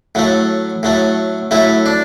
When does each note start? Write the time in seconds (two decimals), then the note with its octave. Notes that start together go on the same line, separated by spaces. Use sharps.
0.15 A2 F#3 A3
0.83 A2 F#3 A3
1.51 A2 F#3 A3 E4
1.86 D4